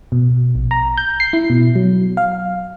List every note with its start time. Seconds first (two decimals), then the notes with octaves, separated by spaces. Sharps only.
0.12 B2
0.55 A#1
0.71 A#5
0.97 G6
1.20 C7
1.33 E4
1.50 B2
1.75 F#3
2.17 F5